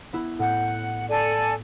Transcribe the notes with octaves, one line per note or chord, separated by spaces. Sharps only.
B3 E4
A2 F#5 G6
A4 D5 G#5